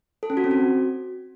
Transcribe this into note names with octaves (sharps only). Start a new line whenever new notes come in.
A4
C#4
F#4
C4
F#4